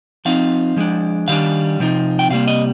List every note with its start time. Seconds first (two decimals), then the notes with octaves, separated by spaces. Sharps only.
0.25 F3 C4 D#4 F5
0.76 F3 G#3 D4
1.28 D#3 G3 D4 F5
1.80 C3 F3 C4 D#4
2.19 G5
2.30 C3 G3 A#3 F5
2.48 D#5